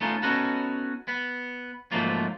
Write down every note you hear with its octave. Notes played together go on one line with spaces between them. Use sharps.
A3 B3 C#4 D#4 F4
B3 C#4 D#4 F#4 A4
B3
G#2 F3 F#3 A3 A#3 F4